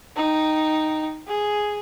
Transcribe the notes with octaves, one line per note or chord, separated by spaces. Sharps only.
D#4 G5
G#4